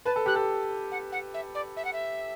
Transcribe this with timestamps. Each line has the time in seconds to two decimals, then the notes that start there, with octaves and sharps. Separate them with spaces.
0.05 B4 A5
0.16 A4
0.26 G4 F#6
0.36 A4
0.91 F#5
1.12 F#5
1.34 E5
1.54 D5
1.76 E5
1.84 F#5
1.93 E5